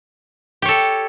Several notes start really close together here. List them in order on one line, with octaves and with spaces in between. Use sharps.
G4 C#5 A4